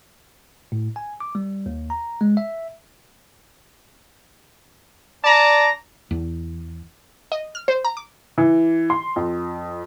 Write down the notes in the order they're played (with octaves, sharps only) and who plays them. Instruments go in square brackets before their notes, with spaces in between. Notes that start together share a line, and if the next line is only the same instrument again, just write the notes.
[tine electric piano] A2
G#5
D6
G3
D#2
A#5
G#3
E5
[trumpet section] D4 D5 A5 A#5
[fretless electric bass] E2
[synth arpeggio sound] D#5
F6
C5
A#5
D6
[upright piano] E3
C6
F2